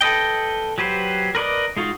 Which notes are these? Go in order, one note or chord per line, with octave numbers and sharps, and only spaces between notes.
A4 B4 D#5 G5
F#3 G4 B4 C5
A#4 B4 D5 D#5
G#3 D#4 F4 F#4